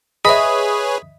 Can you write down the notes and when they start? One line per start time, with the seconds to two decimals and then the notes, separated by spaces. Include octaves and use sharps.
0.25 G#4 B4 C#5 D#5 E5 B5 D#6